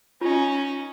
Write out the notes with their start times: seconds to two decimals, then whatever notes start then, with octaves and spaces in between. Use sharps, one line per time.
0.21 C#4 D#4 F4